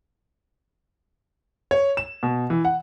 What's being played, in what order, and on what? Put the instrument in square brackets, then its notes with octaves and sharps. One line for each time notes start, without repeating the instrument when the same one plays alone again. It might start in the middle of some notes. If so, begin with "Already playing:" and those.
[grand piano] C#5
E7
B2
E3
F#5